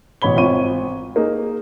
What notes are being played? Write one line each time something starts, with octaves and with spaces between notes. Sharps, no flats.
A1 B2 C#5 B5 G7
G#1 F4 C#5 C#6 D#7
A#3 D#4 G#4